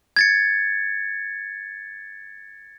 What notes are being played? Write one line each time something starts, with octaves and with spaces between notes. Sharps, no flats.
G#6 A6 C#7